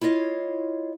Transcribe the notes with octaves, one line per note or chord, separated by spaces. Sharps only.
E4 F4 C#5 D#5 F5